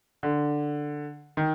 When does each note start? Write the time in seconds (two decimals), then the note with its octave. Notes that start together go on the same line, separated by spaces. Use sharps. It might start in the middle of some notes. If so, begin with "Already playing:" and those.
0.23 D3
1.37 D#3